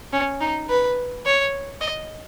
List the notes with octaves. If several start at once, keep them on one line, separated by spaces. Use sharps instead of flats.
C#4
D#4
B4
C#5
D#5